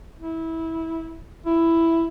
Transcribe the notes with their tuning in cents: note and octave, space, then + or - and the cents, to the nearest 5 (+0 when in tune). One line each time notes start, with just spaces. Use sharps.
E4 -20
E4 +5